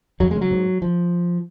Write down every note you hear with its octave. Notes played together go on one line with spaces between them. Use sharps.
F2 F#3
C#3 G#3
F#3
G#2
F3